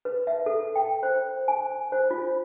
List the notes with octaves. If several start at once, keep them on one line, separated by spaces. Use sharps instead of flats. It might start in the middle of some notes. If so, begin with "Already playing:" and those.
B4
E5
A4
G5
C5
G#5
C5
F4